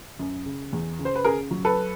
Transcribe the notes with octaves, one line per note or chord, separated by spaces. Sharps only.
F#2
C#3
E2
C#3
C5
B4
C#3 G#4 A#4
F#3
A4 B4